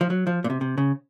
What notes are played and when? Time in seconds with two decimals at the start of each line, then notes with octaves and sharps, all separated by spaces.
0.01 F3
0.10 F#3
0.27 F3
0.44 A#2
0.50 C3
0.61 C3
0.78 C#3